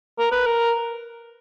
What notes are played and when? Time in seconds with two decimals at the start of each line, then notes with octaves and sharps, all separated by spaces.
0.19 A#4
0.32 B4
0.46 A#4